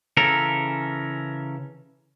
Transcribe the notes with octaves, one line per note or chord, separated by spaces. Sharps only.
C#3 E3 C#4 A4 A#4